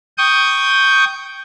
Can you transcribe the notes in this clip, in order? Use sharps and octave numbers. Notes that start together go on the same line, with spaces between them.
G5 C#6 D#6 G6